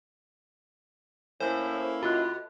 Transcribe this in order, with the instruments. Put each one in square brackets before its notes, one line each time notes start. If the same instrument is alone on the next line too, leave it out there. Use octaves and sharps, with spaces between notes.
[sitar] A2 [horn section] A#3 C#4 E4 [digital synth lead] C5 [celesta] G#5
[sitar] B2 [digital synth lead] F4 [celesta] B5 F#6